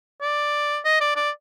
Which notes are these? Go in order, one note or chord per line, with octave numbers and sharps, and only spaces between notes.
D5
D#5
D5
D5